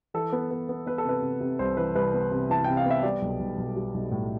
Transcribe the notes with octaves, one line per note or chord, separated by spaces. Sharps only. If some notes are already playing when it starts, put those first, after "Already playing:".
E3 A4
B3
B3
B3
B3 B4
A4
C3 B4
C3
C3
C2 C5
E3 B4
C2 B4
B3
C3
E3 A5
C3 G5
F5
B3 E5
G3 D5
B1
B1
B1
G3
B1
A2